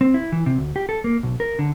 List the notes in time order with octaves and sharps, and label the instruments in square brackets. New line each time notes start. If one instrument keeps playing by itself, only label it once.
[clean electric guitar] C4
E4
E3
C3
D2
G4
A4
A#3
B1
A#4
D3